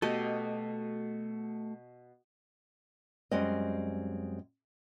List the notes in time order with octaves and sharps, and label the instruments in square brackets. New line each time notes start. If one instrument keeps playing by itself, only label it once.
[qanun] B2 G4 D#5 [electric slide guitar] A3 F#4 A4
[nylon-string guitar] F#2 G3 G#3 C4 D#5